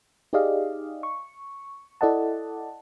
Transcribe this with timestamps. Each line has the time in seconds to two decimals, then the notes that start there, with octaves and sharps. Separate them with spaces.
0.33 D#4 G4 G#4 D5 D#5 F5
1.03 C#6
2.01 E4 A4 D5 D#5 F#5 A5